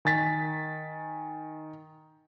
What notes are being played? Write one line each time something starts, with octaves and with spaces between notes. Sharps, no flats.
D#3 G#5 A6 B6